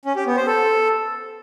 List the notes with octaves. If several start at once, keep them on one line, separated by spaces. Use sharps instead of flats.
C#4
G4
B3
C5
A4